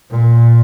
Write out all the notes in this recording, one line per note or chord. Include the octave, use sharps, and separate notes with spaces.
A#2